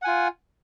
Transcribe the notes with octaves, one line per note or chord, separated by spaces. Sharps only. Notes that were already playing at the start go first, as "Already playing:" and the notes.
F4 F#5 G#5